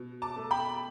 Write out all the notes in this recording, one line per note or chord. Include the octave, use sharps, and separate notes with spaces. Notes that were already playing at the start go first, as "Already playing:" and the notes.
Already playing: B2
A5 D6
A3
G5 B5